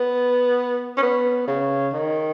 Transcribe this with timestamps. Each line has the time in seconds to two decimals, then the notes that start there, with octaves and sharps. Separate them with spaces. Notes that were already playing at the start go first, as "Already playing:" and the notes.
Already playing: B3
0.97 C#4
1.02 B3
1.48 C#3
1.93 D#3